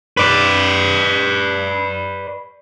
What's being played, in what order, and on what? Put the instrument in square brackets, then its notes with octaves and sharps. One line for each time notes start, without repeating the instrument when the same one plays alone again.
[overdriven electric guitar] B4 D5